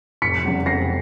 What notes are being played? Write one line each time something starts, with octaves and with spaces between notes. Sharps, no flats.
F1 B6 C#7
E2 C#3 F#3
F1 A#6 C7